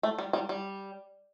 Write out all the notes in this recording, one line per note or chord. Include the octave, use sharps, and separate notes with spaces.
A3
G3
G3
G3